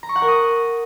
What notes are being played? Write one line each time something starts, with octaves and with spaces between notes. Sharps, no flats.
A#5
C#6
F#5
A#4
D#6